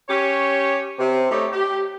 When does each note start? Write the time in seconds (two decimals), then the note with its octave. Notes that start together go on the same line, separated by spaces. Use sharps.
0.09 C#4 G4 C#5
0.99 C3
1.30 A3 D#4 G4 C#5
1.51 G4